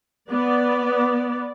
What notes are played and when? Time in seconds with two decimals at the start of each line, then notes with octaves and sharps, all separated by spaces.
0.30 B3 D5